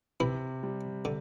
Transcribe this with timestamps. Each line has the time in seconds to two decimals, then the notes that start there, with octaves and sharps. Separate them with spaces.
0.20 C3 E3 E4
0.63 G3
1.05 D3